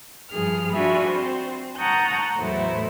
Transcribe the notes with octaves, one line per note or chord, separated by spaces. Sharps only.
G2 F3 G#4 F6
D4 F4 F#4 E5 G#5 B5
C4 C5
F#5 A5 A#5 C#6 D#6 G6
E2 A2 F#3 A3 E4 C5